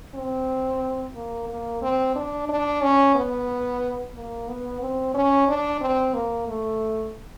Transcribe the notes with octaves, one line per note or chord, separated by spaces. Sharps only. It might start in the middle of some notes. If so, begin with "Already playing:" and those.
C4
A#3
A#3
C4
D4
D4
C#4
B3
A#3
B3
C4
C#4
D4
C4
A#3
A3